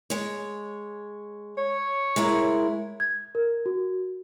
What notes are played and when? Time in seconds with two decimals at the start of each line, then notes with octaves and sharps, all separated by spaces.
0.10 G#3 C#5
1.58 C#5
2.16 G#3 E4 A#4
3.00 G#6
3.35 A#4
3.66 F#4